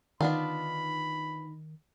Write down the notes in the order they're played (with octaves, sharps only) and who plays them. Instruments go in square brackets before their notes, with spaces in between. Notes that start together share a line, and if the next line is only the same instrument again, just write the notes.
[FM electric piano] D3 D#4 [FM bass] D#3 [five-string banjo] B3 D4 F4 [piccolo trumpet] B5